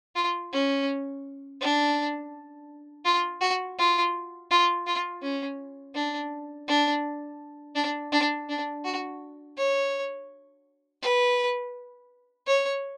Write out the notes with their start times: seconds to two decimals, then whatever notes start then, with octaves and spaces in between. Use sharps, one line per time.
0.15 F4
0.52 C#4
1.61 D4
3.05 F4
3.41 F#4
3.78 F4
4.50 F4
4.86 F4
5.22 C#4
5.95 D4
6.68 D4
7.75 D4
8.12 D4
8.49 D4
8.85 F#4
9.57 C#5
11.02 B4
12.47 C#5